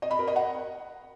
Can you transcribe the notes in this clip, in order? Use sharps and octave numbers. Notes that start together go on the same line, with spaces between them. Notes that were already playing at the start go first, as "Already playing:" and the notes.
D#5
B5
A#4
D#5
F#5